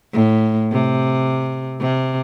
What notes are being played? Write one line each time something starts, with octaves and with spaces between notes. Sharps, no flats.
A2
C3
C3